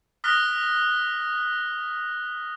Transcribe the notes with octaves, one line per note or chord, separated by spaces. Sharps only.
D#6 F6 F#6 A#6 B6 G7